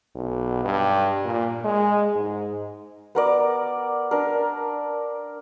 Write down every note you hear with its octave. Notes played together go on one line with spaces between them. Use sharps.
B1
G2
A#2
G#3
G#2
B3 A#4 D5
D4 A#4